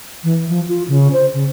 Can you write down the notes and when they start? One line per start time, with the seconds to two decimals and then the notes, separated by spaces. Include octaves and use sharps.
0.24 E3
0.49 F3
0.68 F4
0.88 C#3
1.13 C5
1.34 C#3